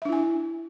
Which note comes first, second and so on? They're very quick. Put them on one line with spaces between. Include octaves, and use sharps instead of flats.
E5 D4 E4 G#5